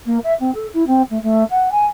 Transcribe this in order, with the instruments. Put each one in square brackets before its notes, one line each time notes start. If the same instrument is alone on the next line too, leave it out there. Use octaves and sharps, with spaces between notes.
[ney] A#3
E5
C4
A4
E4
C4
A3
A3
F#5
G#5